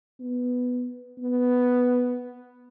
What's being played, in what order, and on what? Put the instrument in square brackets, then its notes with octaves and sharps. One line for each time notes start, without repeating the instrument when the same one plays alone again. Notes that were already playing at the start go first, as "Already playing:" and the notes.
[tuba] B3
B3